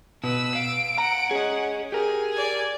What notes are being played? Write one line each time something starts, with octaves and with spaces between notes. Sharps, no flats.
B2 B4 E6
F5 D7
F#5 A#5
C#4 G#4 D#5
G4 G#4 A#4
D5 G#5